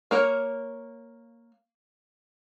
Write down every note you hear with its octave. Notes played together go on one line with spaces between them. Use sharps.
A#3 A#4 C#5